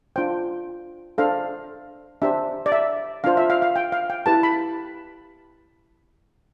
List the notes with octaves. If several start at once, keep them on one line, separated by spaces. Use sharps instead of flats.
D4 F4 C5 G5
D4 A4 C5 F5
D4 G4 C5 E5
D5
E5
D4 F4 C5 F5
E5
F5
F5
G5
F5
G5
E4 G4 B4 A5
B5